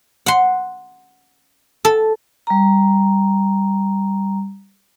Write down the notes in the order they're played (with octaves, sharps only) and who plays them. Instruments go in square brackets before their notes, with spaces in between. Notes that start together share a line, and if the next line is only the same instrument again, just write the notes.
[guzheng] F#5 C6
A4
[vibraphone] G3 A#5